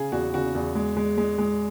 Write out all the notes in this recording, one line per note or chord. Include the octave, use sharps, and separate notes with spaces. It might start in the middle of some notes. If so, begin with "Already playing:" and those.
Already playing: C#3 G#4
E2 F#4
C#3 F#4
E2
G#3
G#3
G#3
G#3